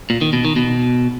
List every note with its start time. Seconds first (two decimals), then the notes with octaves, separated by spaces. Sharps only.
0.10 A#2
0.21 D#3
0.33 B2
0.45 D#3
0.56 B2